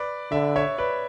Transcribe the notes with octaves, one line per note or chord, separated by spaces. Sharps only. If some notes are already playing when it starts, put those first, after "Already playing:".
Already playing: B4 D5
D3 E5
C#5 E5
B4 D5